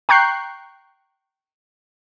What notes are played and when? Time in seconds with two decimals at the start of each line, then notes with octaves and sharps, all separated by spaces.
0.09 G5 A#5 C#6 F#6 G6 C7